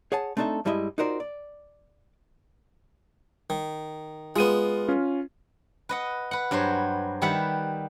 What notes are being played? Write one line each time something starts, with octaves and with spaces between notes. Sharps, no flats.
G#4 C#5 F#5 G#5 A5
A3 C4 D4 D#4 A4 E5
G2 G3 G#3 E4 D#5 E5
D#4 F4 F#4 A#4 C5 D5
D5
D#3
G#3 B3 F4 D#7
C#4 F4
B4 D#5 F#5
B4 F#5
G2 F#3 B4 C5
D#3 G3 B4 E5 F#5